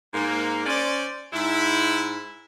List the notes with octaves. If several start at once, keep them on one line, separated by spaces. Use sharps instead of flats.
G#2 A#3
C#4 C5 D5
G#2 E4